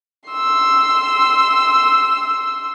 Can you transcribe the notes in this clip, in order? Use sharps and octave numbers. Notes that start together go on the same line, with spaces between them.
C6 E6